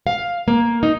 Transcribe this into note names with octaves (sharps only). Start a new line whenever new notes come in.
F5
A#3
D#4